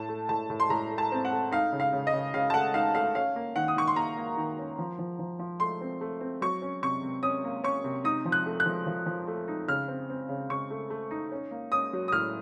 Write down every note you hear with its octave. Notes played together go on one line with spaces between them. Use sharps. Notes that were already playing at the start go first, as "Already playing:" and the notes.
Already playing: A2 A5
A3
A2 A5
A2
C6
A2 A#5
A3
A5
C4
F#5
A3
D#4 F5
C#3
F5
C#3
D#5
C#3
C#3 F5
A5
A3 F#5
D#4 F5
A3 F5
C#4 F5
A#3
D#3 F#5
D#6
D#3 C#6
C6
A#3 A#5
A#3
D#3
C#4
F3
F3
F3
F3
A3 C6
C4
A3
C4
F#3 C#6
C#4
C3 C#6
C3
C#4 D#6
A#3
C#4 C#6
C3
D#4 D#6
F3
F#6
A3
F#6
F3
F3
F3
A3
D#4
C#3 F6
C4
C4
C#3
C#3 C#6
A3
A3
D#4
C#4
A#3
C#4 D#6
F#3
D#6
A2 F6